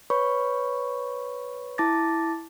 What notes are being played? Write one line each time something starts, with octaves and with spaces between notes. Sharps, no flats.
B4 C#5 B5 C#6
E4 A5 D6 A6 A#6